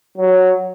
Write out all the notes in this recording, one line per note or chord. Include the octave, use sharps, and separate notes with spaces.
F#3